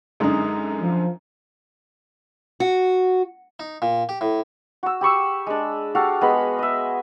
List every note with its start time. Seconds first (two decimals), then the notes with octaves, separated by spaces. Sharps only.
0.20 F#2 D3 G#3 D#4
0.81 F3
2.60 F#4
3.60 D#4
3.82 A#2
4.09 G4
4.21 A2
4.83 F#4 E6
5.01 G4 B5 C#6 E6
5.47 G#3 D4
5.95 F#4 G4 A4 F5
6.21 G#3 B3 G#4 B5
6.59 D#5 E5